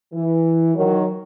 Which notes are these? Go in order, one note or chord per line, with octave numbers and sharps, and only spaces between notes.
E3
D#3 F#3